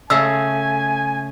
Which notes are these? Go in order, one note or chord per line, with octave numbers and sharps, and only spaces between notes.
C#3 A3 G#5 E6